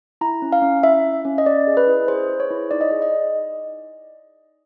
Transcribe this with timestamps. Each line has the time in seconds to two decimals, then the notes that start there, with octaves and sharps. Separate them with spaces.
0.21 E4 A#5
0.42 C#4
0.53 F5
0.62 C#4
0.83 E4 E5
1.04 C#4
1.25 C#4
1.38 D#5
1.46 C#4 D5
1.67 G#4
1.77 B4
1.87 E4
2.08 G#4 C5
2.29 G#4
2.40 C#5
2.51 E4
2.71 D#4 D5
2.81 D#5
2.91 G#4 D5
3.02 D#5
3.12 D#4